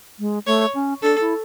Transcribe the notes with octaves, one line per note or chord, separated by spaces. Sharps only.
G#3
A3 C#5
C#4
D4 A4
E4